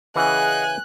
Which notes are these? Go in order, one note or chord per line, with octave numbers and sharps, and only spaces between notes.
C#3 E3 G#4 D#5 F#5 G#5 F#6